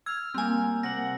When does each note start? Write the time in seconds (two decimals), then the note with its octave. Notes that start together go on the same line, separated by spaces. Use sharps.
0.06 E6 F6 G#6
0.34 G3 A#3 C4 G#5 E6
0.83 C3 A#3 F#5 A#6 F#7